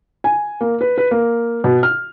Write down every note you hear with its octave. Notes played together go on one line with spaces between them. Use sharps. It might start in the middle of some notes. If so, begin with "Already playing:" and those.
G#5
A#3
B4
B4
A#3
B2
F6